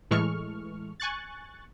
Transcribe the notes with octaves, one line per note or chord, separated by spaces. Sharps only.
A2 E3 G#3 A4 C#6 F6
G#5 C#6 F#6 A6